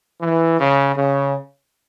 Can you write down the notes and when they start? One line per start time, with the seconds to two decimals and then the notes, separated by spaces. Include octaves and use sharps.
0.21 E3
0.58 C#3
0.95 C#3